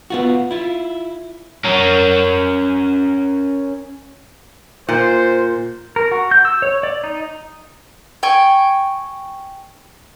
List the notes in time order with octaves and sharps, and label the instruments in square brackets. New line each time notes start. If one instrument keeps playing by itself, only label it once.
[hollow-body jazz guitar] B3 F4 F#4
E4 F4
[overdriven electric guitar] C#4 A#4
[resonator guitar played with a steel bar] A#2 [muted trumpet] C5
[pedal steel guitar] A#4
F#4
G6
E6
C#5
D5
D#4
[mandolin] G5 G#5 C#6